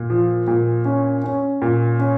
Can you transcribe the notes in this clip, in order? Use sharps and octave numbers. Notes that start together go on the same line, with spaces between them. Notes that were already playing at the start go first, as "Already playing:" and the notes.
Already playing: A#2
F3
A#2
C#4
C#4
A#2
C#4